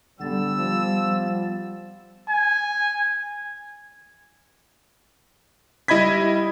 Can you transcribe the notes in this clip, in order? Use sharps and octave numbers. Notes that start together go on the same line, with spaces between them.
D3 G3 B3 E6 A6
F3
G#5
G3 E4 D#5 B5 G#6 B6